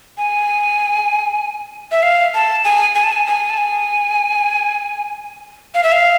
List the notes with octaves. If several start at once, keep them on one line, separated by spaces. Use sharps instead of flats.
G#5
E5
F5
A5
G#5
G#5
A5
G#5
G#5
A5
G#5
F5
E5
F5